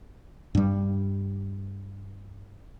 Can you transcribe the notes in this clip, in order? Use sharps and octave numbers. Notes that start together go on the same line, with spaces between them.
G2 G3